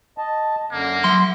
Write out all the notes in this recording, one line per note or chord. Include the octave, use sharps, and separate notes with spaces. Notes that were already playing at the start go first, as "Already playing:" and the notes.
D#5 A5
F#2 D3 A#3
F#3 E5 C6